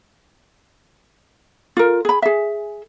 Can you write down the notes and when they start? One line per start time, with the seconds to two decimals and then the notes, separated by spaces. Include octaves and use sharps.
1.77 F4 A#4
2.05 G#4 B5
2.22 G#4 E5